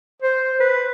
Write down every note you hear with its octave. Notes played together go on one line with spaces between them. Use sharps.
C5
B4